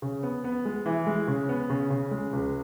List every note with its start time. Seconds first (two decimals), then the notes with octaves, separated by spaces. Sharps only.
0.02 C#3
0.23 B3
0.44 B3
0.65 G#3
0.86 E3
1.07 G#3
1.28 C#3
1.49 B3
1.70 C#3
1.90 C#3
2.11 G#3
2.33 C#2